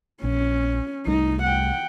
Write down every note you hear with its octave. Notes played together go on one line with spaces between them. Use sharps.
A#1 C#4
C2 G3 A3 D#4
F#5 G5